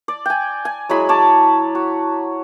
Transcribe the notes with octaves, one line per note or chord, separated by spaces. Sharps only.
D5
G5 G#5
G#5
F#3 G#3 E4 B5
C#5 A5 D6
F#4